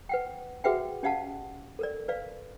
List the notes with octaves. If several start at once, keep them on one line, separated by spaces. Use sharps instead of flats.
B4 F#5 G5
F#4 G#4 B4 E5 F#5 G5
C#4 G4 D#5 F5 F#5 A5
A4 A#4 D5
A#4 B4 D5 F5